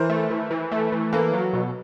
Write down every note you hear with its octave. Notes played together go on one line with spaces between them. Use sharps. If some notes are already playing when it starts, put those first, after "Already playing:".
Already playing: E3 A#4 C5
A3
E3
E3
A3
E3
A#3 A4 B4
F#3
B2